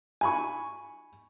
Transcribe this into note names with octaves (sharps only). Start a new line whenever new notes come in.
G#5 B5 C#6